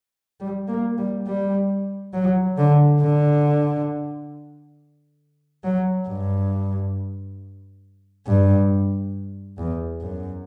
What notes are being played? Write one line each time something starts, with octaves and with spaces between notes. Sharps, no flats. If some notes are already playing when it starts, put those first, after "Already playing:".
G3
A#3
G3
G3
F#3
D3
D3
F#3
G2
G2
E2
F#2